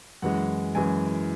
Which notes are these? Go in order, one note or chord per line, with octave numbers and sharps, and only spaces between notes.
F#2 E3 G#3 F#5
F#2 E3 G#3 G#5